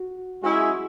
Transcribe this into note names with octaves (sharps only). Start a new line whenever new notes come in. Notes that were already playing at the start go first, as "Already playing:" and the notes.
Already playing: F#4
G#3 C#4 E4 F#4 G#4